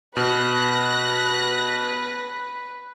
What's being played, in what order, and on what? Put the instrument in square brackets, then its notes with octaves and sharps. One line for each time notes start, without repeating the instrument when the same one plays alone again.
[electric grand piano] B2 [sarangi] B4 [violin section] F#6 A#6